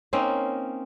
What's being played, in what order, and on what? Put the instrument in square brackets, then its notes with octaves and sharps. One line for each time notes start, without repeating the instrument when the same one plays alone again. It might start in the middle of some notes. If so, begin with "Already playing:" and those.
[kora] A#3 C4 C#4 D#4